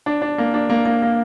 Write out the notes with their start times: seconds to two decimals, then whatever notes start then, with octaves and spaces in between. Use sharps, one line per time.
0.06 D4
0.22 D4
0.38 A#3
0.54 D4
0.70 A#3
0.86 A#3
1.02 A#3